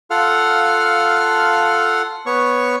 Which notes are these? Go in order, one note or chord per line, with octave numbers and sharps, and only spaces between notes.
F4 A4 F5 F#5 F6
B3 C#5 C#6